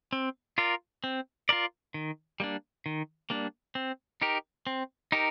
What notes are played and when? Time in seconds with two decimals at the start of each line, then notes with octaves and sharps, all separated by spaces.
0.13 C4
0.58 F4 A#4 D5
1.04 C4
1.49 F4 A#4 D5
1.94 D#3
2.40 G3 A#3 D4
2.86 D#3
3.30 G3 A#3 D4
3.75 C4
4.22 D#4 G4 A#4
4.67 C4
5.12 D#4 G4 A#4